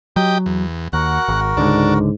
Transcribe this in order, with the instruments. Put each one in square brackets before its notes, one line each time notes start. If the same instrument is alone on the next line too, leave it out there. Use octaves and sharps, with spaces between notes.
[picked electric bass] F#3 [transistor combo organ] G4 D#5 G5
[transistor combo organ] E2
[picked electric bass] D#2 [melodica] F#4 A#4 [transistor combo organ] F#5
[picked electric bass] G#1
[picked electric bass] C#2 D3 [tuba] G#2 [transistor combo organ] D4